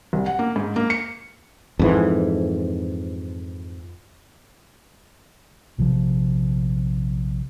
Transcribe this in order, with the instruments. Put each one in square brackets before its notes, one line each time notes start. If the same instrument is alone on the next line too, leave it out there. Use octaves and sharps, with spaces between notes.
[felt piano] C2
F#5
A#3
G#2
A#3
C#7
[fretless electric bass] F2 G#2 E3
[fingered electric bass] A#1 C3 E3 F3